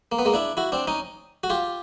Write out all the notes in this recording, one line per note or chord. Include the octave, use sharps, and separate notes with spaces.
A#3
B3
G#3 A#3
D4 E4
E4 F#4
C4 D4
C#4 D#4
F#4
F4 G4